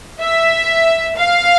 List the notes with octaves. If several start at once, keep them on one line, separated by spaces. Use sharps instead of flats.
E5
F5